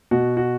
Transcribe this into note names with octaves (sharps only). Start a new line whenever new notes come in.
B2 F#4
F#4